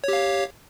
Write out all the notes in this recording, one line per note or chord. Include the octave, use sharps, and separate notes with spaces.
G4 C#5 F5